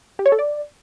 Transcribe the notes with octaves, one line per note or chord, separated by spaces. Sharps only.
G4
C#5
A4
D5